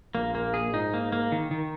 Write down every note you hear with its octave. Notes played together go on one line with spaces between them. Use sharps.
A#1 A#2 A#3
A#3
G#4
G#2 D#4
A#3
A#3
D#3
D#3